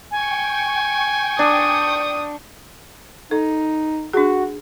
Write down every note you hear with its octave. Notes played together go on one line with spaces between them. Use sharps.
G5 G#5 C#6
D4 D#6
D#4 A4
D4 F#4 G#4